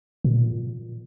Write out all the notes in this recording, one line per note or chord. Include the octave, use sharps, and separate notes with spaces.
A#2